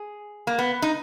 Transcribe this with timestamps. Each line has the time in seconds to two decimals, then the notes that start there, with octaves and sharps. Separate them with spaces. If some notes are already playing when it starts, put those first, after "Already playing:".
Already playing: G#4
0.47 A#3
0.58 B3
0.82 D#4